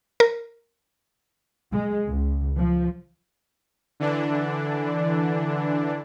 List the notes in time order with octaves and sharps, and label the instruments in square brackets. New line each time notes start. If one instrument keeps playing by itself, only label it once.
[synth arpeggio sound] A#4
[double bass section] G#3
C#2
F3
[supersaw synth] D3 E3 D4